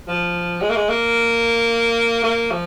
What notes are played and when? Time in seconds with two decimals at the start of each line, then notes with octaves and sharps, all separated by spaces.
0.08 F3
0.61 G#3
0.70 A#3
0.76 G#3
0.89 A#3
2.24 A#3
2.51 F3